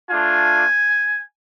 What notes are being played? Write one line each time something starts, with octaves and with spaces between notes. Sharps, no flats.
A3 D4 F4 G#5